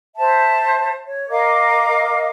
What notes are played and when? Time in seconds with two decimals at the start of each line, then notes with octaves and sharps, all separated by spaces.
0.17 C5 E5 A5
1.05 C#5
1.29 A#4 D#5 F5 D6